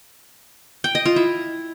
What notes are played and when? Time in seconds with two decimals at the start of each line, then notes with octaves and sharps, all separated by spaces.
0.84 G5
0.95 D#5
1.06 F4
1.16 E4